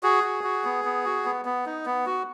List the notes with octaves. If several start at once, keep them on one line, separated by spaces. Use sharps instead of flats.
F#4 G#4
F#4
F#4
B3
B3
F#4
B3
B3
D#4
B3
F#4